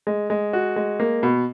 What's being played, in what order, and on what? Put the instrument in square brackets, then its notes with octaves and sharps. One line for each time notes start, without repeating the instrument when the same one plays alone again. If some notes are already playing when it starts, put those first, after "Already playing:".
[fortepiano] G#3
G#3
F#4
G#3
A#3
B2